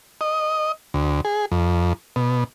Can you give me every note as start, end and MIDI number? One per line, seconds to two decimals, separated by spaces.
0.21 0.72 75
0.94 1.21 38
1.25 1.45 68
1.52 1.93 41
2.16 2.44 47